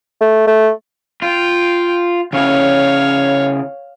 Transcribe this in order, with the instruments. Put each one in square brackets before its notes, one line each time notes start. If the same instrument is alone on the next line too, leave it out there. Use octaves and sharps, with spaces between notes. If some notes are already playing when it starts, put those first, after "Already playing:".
[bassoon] A3
A3
[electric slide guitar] F4 [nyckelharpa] G5
[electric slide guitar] C#3 C#4 E4 [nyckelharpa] C#5 F5